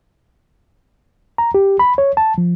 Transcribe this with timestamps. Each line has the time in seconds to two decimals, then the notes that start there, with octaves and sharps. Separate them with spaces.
1.38 A#5
1.55 G4
1.79 B5
1.98 C#5
2.17 A5
2.38 F3